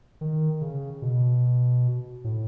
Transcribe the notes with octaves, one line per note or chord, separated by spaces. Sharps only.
D#3
C#3
B2
A2